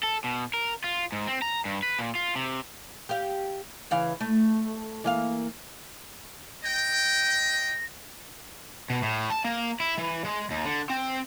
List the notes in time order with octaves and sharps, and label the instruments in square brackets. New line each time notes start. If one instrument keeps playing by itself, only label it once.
[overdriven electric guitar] A4
B2
A#4
F4
G#2
C4
A#5
G2
B4
A#2
F4
C3
[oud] G4 F5
C#3 E3 F5
A3
E3 A#3 F5
[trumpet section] D#5 G5 [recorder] A#6
[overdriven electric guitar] B2
A2
A5
A#3
E4
E3
G#3
D#2
D3
C4